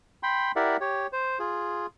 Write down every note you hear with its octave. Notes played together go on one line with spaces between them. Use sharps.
G5 B5 C6
E4 G4 A#4 D5 E5 F#5
G4 C#5
C5
F4 G#4